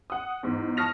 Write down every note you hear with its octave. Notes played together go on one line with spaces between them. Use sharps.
F#5 D#6
E2 G#2
A5 C#6 D#6 F6 A#6 F7